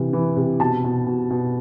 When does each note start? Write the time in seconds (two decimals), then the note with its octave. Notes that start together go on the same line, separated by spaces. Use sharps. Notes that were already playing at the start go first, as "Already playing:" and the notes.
Already playing: C3 E3
0.13 E3
0.36 C3
0.60 B2 A5
0.84 B2
1.06 B2
1.30 B2